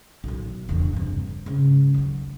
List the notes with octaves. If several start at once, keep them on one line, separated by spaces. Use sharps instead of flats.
B1 D#3
E1 D3
G2 C3
G#2 C#3
D#3 F#3